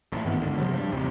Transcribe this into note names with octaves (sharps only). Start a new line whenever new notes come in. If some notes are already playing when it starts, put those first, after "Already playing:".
A1 A2
G2 D#3 B3
C#2 D3
C3 F3 F#3
G2
A1 D#2 C3